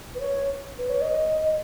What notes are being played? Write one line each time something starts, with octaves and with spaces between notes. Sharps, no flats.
B4
C#5
B4
C#5
D#5